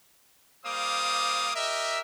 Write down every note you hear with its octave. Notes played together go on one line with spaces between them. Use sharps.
G3 A#3 C5 F5 D6 D#6
G4 A#4 D#5 E5